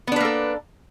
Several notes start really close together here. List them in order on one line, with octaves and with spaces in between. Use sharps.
B3 D4 B4 A#3 A4